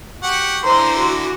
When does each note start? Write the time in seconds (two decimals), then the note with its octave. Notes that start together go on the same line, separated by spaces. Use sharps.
0.23 F#4 G4 F#5
0.63 D3 E3 C5 A#5 C6
0.99 F#4